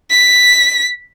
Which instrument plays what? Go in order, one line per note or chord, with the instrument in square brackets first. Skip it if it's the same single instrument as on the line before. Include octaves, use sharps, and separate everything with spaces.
[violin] B6